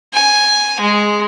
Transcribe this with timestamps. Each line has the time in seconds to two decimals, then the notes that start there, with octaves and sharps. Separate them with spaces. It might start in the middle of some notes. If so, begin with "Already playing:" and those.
0.13 G#5
0.80 G#3